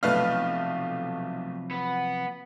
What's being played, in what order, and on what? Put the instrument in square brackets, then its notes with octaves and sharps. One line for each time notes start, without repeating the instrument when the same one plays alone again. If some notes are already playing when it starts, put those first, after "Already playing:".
[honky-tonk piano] B1 A3 F6 [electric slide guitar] C3 F3 F#3 [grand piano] B4 F5
[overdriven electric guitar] B3